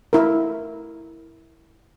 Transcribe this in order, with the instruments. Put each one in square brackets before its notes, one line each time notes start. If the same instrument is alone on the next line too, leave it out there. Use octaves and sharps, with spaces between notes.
[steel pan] E4 A#4